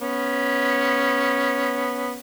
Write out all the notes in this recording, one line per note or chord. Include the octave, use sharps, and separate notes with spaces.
B3 C#4